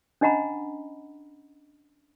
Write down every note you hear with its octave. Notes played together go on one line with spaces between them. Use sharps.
C#4 D4 D#5 F#5 A#5 B5